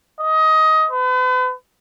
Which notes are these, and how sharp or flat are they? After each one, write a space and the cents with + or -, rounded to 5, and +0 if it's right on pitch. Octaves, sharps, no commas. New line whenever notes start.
D#5 +20
B4 +40